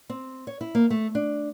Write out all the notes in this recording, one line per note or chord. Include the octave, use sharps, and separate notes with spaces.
C4
C#5
E4
A#3
A3
D4